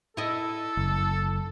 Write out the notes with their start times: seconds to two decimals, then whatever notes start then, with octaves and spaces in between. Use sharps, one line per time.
0.17 E4 A4 D#5
0.77 F#1